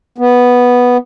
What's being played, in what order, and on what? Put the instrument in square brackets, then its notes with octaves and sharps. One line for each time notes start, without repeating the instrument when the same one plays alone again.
[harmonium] B3